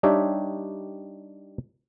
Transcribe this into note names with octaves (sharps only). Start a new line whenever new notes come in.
G3 D4 D#4 G4 C#5 E5